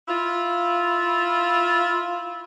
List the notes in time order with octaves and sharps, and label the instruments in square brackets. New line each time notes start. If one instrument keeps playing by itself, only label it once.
[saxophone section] E4 F4